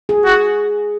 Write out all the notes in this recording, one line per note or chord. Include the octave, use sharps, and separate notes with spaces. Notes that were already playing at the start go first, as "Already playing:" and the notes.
G#4
F#4